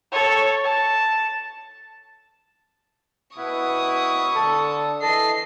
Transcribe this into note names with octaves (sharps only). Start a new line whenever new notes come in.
A4 C#5
A5
B2 B3 E4 C#6 D#6
D3 A4
E3 A4 D#5 C7